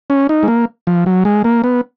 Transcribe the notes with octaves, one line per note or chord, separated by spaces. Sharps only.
C#4
D#4
G#3
A#3
F3
F#3
G#3
A#3
B3